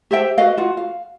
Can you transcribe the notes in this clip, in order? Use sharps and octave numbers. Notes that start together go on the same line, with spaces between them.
G4 C5 E5 G5
F#4 B4 D#5 F5
F4 F#4
F5